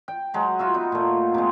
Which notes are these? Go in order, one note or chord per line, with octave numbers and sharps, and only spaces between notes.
G5
F#3 G#3
F4 F#4 E5
B3 D#4
A#2 A3
C3 G#3